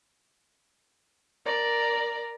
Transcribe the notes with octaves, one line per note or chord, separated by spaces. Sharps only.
A#4 D5